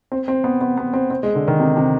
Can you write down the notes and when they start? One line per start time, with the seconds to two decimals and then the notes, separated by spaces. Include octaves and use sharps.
0.12 C4
0.28 C4
0.44 B3
0.61 B3
0.77 B3
0.94 C4
1.11 C4
1.23 G#3
1.35 D3
1.47 D#3
1.60 C3
1.77 C3